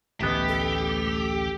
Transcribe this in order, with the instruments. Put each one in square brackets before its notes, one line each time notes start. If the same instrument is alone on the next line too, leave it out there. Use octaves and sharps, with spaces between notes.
[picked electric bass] A1 D2 A3 [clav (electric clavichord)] B3 D#5 E5 [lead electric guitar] G4
[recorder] A4